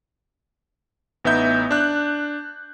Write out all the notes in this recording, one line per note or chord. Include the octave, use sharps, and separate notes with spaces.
A1 B3 D#4 E5 G6
D4 F#6